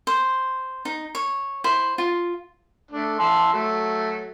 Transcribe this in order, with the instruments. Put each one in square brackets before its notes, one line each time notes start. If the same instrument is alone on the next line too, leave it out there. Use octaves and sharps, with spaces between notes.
[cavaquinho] C5
D#4
C#5
E4 C5
F4
[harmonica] A3 D4
E4 A5 C6
F#3 A3